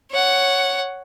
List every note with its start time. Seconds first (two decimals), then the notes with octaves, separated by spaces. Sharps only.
0.11 C#5 F#5